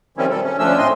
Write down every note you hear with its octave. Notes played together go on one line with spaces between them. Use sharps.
D#3 F3 G3 C4 C#4 E4
B2 D#3 G3 A4
C#4
D2 F3 A3 C#4 D4 E6
A2 A3 C4 D#5 G#5 C6